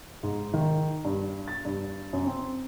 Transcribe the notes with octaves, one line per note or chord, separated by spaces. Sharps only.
G#2
D#3
G2
A6
G2
F#2
C4